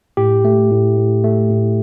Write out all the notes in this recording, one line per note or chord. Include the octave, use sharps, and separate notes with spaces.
A2 G4
A3
A2
A2
A3
A2